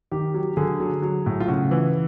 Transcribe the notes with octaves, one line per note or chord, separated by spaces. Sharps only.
D#3 G4
F#3
D3 G#4
F#3
F#3
A2
F4
C#3 F#4
E3